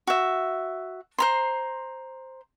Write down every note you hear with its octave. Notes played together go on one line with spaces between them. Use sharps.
F#4 E5
C5 A#5 C6